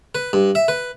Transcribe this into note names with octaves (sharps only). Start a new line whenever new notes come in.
B4
G2
E5
B4